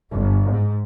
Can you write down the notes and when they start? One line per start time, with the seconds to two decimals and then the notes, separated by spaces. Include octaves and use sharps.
0.12 G1
0.49 G#2